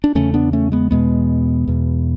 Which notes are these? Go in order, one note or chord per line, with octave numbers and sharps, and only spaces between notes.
D4
E2 C#3 A3 C#4
B3 D4
A3 C#4
G#3 B3
E2 B2 G#3 B3
E2 B2